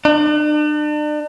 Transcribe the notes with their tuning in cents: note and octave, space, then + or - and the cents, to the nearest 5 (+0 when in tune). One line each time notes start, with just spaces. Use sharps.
D4 +40